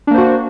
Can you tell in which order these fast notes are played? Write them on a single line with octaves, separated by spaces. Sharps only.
D4 A#3 C5 F#4